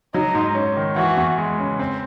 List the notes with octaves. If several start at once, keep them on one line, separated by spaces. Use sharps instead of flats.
F#3 D#4
G#2
C#4
D#3
E3 F#4
E2
G#3
C#3
C4